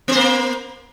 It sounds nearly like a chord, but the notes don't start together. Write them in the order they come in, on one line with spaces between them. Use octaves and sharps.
B3 C5 A#3